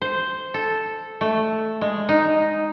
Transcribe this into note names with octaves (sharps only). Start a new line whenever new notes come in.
C5
A4
A3
G#3
D#4